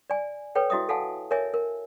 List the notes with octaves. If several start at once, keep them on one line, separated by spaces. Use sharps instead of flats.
D5 G#5
A4 B4 C#5 G5
E4 F#4 D#5 E5 D#6
A4 F5 F#5 G#5 A5
A#4 C#5 D#5 E5 G#5
A#4